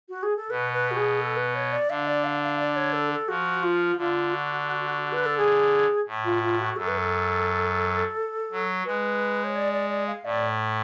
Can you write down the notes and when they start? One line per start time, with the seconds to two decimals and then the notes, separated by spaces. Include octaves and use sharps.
0.09 F#4
0.23 G#4
0.37 A4
0.50 B2 B4
0.73 B4
0.91 F#4
0.96 G#4
1.20 A4
1.37 B4
1.55 C#5
1.72 D5
1.89 D3 F5
2.07 D5
2.24 F5
2.42 F5
2.60 D5
2.76 C#5
2.93 A4
3.11 A4
3.28 F3 F#4
3.63 F4
3.98 D3 F4
4.34 F#4
5.13 B4
5.26 A4
5.37 G#4
6.07 A2
6.25 F4
6.43 F4
6.60 F#4
6.76 F#2 A4
6.88 B4
6.98 A4
8.51 F#3
8.85 G#3 B4
9.44 C#5
9.56 D5
9.73 D5
9.90 D5
10.07 F5
10.25 A2 D5